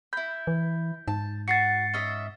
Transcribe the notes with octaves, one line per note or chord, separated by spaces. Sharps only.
E4 B5 G6
E3
G#2 A5
F#4 A6 C7 C#7
C#4 D#5 E5